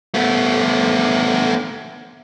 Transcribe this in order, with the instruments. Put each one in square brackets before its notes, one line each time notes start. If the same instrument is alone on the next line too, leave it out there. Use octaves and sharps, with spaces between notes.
[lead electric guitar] A3 B3